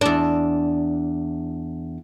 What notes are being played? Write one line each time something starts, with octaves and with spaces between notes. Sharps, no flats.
E2 D4